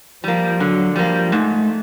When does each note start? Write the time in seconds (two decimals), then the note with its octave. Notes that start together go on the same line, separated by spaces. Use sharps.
0.24 F3 G3 A#3
0.59 D3 F#3
0.96 F3 G3 A#3
1.32 G#2 A3